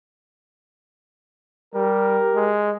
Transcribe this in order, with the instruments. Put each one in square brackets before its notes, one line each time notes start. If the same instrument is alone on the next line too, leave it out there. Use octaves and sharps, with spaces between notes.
[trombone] G3 [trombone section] G4 A#4
[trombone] G#3